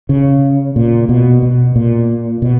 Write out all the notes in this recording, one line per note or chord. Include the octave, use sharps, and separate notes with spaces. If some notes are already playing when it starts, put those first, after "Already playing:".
C#3
A#2
B2
B2
A#2
B2